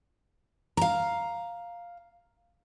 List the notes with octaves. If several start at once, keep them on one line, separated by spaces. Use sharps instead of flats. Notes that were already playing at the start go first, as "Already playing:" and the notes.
F5 A#5